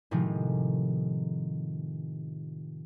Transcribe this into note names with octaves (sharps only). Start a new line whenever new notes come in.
A2 C3 D#3 F3 G#3